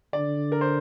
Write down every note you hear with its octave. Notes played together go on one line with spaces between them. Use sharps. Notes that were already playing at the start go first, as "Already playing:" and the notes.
D3 D5
A#4
C5